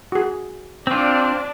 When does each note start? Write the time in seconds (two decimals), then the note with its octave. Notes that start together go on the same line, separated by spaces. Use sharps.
0.12 F#4 G#4
0.87 C4 D4 F4